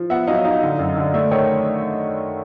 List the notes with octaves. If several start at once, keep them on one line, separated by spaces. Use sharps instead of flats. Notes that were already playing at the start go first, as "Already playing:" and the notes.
Already playing: F3
B3 E5 F#5
F#3 D#5 F5
D#4 D#5 F5
D3
F#2
D3
A3 D5 E5
D#3 C#5 D#5